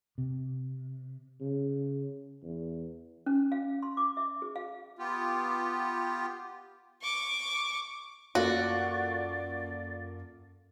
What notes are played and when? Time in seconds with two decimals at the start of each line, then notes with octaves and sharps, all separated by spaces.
0.18 C3
1.40 C#3
2.43 E2
3.26 C#4
3.52 F5
3.83 C6
3.97 D6
4.17 E5
4.42 G#4
4.56 F5
4.99 B3 F4 G4
7.02 C#6 D6
8.35 F#2 A#3 F4 F#4 A4 D5